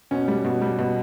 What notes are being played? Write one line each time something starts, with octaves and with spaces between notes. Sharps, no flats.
B2 C#4
G3
B2
G3
B2